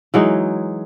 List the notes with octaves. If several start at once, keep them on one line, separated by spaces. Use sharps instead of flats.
E3 F#3 G#3 D#4